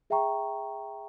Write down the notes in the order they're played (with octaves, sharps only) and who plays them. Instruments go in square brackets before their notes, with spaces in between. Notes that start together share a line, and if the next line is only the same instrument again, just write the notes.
[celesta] G#4 E5 G5 A#5 C#6